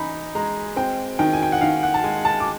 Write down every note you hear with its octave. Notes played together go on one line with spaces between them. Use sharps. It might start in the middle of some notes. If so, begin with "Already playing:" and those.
Already playing: E3 D#4 G#5 A#5 B5
G#3 A#5
C4 G5
D#3 G5
G#5
G5
F#5
D#3 F5
F#5
A5
G#3 G#5
A5
D6